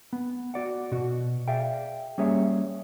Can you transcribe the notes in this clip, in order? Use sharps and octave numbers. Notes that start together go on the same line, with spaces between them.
B3
F#4 D5 F#5
B2 F#4
G#4 D5 E5 F5 G5
G3 A#3 C#4 G#4 C#5 E5